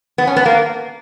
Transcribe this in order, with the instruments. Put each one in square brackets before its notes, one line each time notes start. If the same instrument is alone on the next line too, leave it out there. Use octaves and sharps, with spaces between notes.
[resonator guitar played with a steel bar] B3
C#4
B3
A#3